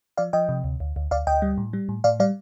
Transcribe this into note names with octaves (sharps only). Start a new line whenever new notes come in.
F3 D5 F5
F3 D#5 G5
C3
D2
D2
D2
D2 D5 F5
D2 D#5 G5
G3
A2
G3
A2
A2 D5 F5
G3 D5 F5